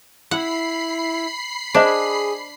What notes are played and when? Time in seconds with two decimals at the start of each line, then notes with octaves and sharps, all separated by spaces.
0.31 E4 F#5 B5 C7
1.74 D4 G#4 C5 D#5